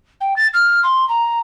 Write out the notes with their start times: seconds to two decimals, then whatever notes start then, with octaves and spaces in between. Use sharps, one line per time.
0.21 G5
0.36 A6
0.54 F6
0.83 C6
1.09 A#5